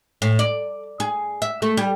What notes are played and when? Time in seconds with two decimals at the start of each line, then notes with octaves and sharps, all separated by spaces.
0.22 A2
0.39 D5
1.00 G#4
1.42 E5
1.62 A3
1.77 G3